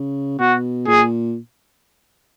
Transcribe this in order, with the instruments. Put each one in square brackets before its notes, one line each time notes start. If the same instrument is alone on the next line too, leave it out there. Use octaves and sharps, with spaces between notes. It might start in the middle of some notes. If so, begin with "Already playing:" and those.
Already playing: [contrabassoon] C#3
[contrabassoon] B2 [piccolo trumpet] F#4
[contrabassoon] A#2 [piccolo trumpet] G#4